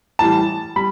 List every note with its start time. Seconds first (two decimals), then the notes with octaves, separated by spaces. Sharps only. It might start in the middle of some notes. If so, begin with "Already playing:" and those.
0.19 A2 E3 G3 A5
0.76 G3 B5